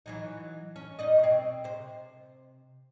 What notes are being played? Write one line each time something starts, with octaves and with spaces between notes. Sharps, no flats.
E3 F#3 D#4
C#4
D#4 D5 D#5
B2 C4
C3 C5